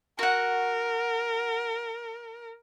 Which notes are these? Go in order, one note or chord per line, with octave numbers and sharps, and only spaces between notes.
F#4 A#4 F#5